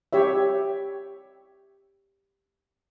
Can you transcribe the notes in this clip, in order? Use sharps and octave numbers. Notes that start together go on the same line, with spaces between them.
G4 C#5 E5